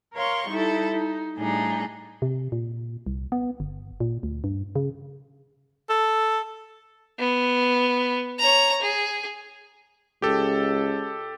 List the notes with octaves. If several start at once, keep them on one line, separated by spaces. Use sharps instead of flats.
A#4 C#5 F5 C6 C#6
G3 D#4 E4 A4
D#4
A2 G3 D4 D#4 G#4
C3
A#2
C2
B3
G1
A#2
D2
G2
C#3
A4
B3
C#5 A#5
G#4
C#2 G4 A4